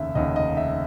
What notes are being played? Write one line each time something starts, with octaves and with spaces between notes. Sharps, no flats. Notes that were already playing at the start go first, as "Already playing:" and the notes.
Already playing: F1 D#2 C#3 E5
F1 D#2 C#3 D#5
D#5
E5